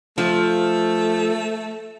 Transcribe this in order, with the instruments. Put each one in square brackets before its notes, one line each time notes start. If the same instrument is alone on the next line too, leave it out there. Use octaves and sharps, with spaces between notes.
[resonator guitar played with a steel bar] F3 [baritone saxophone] A3